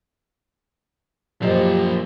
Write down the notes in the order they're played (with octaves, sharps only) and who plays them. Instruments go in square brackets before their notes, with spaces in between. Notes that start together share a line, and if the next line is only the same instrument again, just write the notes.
[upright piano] F#2 C5 D#5 [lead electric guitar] F3 A#3 [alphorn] G4